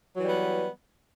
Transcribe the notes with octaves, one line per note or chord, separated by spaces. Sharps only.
E3 F#3 G3 B3